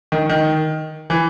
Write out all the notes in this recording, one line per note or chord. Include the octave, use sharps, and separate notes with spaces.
D#3
D#3
E3